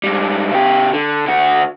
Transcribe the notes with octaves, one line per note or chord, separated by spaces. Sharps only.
G#2 G3
C#3 G4
D3
D3 F#4